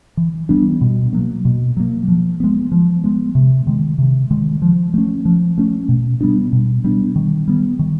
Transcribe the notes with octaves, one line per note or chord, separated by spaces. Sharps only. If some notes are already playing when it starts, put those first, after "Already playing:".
E3
G3 B3 D4
B2
F#3 A#3
B2
F#3 A#3
F3
G#3 B3
F3
G#3 B3
C3
D#3 G#3
C3
D#3 G#3
F3
A3 C#4
F3
A3 C#4
B2
G3 B3 D4
B2
G3 B3 D4
D#3
G3 B3
D#3